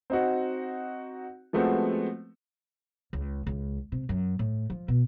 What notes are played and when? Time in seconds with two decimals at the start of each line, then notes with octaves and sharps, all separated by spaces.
0.10 C4 D#4 F#4
1.53 F3 G#3 A3 B3 C4 F#4
3.13 C#2
3.47 C#2
3.92 C3
4.09 F#2
4.39 A2
4.70 F3
4.88 B2